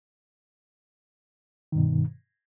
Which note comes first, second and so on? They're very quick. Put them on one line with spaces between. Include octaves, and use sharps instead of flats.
D#3 G2 B2